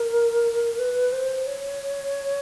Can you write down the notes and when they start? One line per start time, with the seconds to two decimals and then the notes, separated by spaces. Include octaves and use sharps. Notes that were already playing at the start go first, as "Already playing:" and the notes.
Already playing: A#4
0.79 B4
1.12 C5
1.47 C#5